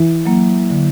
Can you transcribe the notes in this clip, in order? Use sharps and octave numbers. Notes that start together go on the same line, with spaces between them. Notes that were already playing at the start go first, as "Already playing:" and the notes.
Already playing: E3
F#3 A#3
D3